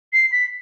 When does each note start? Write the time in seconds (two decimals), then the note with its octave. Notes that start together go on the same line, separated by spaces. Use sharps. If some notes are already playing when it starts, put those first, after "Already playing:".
0.13 C7
0.32 B6